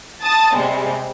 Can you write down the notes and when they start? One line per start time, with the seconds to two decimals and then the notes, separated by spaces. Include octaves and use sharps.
0.23 A5 D#6 A6
0.55 C3 G3 G#3 C4